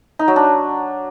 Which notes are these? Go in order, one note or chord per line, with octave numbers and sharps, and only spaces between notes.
D#4
F#3
D4